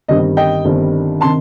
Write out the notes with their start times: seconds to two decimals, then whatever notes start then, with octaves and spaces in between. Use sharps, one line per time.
0.08 G1 G2 D#3 G3 C4 D#5
0.37 D#5 G5
0.65 G1 G2 D#3 G3 C4
1.21 C3 D#3 A5 C6